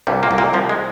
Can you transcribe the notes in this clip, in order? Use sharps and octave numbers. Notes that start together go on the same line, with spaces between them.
C2 G2 G3
A#2 A#3
C2
A#2 A#3
C2 F3
G#3